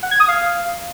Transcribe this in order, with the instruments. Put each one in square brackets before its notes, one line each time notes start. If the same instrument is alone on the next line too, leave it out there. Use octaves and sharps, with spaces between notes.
[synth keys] F#5
G#6
D#6
F5